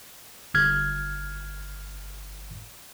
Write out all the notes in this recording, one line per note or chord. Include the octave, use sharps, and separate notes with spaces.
G1 F6 G#6